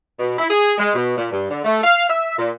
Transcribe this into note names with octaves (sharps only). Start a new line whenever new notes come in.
B2
E4
G#4
G#3
B2
A#2
G2
D3
A3
F5
E5
A#2